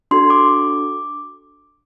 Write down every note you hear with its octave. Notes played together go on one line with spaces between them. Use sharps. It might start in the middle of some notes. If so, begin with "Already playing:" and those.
D4 F#4 A4 C6
D6